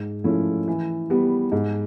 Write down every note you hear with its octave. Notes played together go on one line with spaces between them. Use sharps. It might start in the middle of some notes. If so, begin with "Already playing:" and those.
Already playing: G#2
F3 A3 C#4 E4
E3
G3 B3
G#2